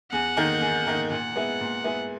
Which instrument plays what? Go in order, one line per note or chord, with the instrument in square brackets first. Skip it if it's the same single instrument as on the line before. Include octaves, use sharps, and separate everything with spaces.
[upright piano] E2 [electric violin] F#5
[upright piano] D#3 A#3 D#4
E2
D#3 A#3 D#4
[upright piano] A#2 [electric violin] F#5
[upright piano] G#3 B3 E4
A#2
G#3 B3 E4